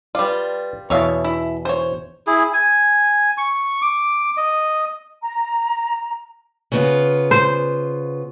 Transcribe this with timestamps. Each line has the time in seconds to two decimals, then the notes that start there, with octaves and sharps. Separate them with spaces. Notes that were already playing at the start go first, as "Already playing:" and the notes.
0.15 G3 F4 B4 D5
0.90 E2 B2 C#5 E5 F5
1.24 E4
1.65 C5 C#5
2.27 E4 G#4
2.53 G#5
3.38 C#6
3.82 D6
4.37 D#5
5.22 A#5
6.72 C#3 B3 F4
7.31 C5